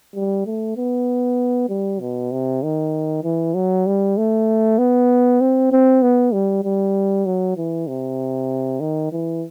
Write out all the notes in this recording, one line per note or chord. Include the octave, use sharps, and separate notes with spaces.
G3
A3
B3
G3
B2
C3
D#3
E3
F#3
G3
A3
B3
C4
C4
B3
G3
G3
F#3
E3
C3
D#3
E3